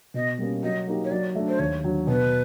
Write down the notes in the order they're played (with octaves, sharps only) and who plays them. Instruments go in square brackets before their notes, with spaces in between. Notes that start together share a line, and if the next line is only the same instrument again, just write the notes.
[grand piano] B2 [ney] D#5
[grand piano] G3 A#3 C#4
[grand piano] F#3 [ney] D#5
[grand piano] A#3 D#4 G4
[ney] C#5
[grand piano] F#3 [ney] D5
[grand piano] A3 D4
[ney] C5
[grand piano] D#2 [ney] C#5
[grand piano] D3 F#3
[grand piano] B2 [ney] B4